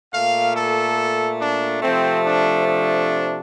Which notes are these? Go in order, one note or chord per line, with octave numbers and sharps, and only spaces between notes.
A#2 A3 F5
A4
D4
C3 F3 A3 C4
D4
D4